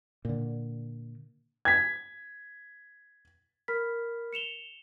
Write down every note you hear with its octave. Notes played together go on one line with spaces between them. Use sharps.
A#2 D3
G#6 B6
A#4 B5 F6 B6
C#7 E7 F7 G7